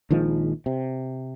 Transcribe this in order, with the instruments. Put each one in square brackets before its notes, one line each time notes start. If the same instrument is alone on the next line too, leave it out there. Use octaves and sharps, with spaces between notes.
[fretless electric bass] A#1 D#3 F3 G#3
C3